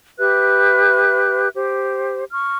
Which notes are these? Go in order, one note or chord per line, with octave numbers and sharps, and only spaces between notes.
G4 B4 E5 F#6
G4 C5
C#6 F6